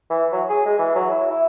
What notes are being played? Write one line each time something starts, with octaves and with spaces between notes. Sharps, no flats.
E3
F#3
G#4
G#3
E3
F#3
E4
E4